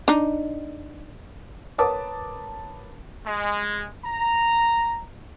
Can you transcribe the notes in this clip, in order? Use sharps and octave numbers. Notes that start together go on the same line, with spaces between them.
D4 D#4
A#4 B4 C#5 A5 D6 D#6
G#3
A#5